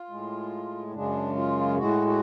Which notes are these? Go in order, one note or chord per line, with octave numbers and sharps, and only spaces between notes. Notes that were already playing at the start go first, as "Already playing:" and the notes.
Already playing: F4
A2 G#3
F#2 C#3 G#3 D4
F4
A2 G#3 F#4
F#4